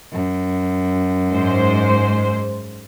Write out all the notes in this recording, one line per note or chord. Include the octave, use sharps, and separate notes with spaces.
F#2
G#2 C5